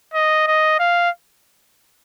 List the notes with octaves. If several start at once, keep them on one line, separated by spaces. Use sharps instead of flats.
D#5
D#5
F5